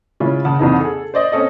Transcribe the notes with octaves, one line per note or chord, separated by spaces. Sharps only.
C#3 G#3 C#4 E4 F4
C#3 F#5 A5
C2 F2 E3 D#4
G#4 A4
C5 D5 D#5
C4 C#4 A4 D#5